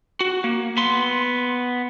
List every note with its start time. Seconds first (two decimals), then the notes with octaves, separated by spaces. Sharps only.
0.21 F#4
0.44 A#3
0.77 B3 C6